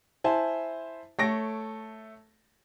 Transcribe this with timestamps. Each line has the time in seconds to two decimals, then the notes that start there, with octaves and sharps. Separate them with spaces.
0.24 E4 C5 G#5 A5
1.19 A3 A4 C#5 A#6 D7